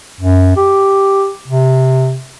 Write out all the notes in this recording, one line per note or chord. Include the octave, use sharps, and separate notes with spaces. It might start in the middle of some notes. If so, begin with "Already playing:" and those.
F#2
G4
C3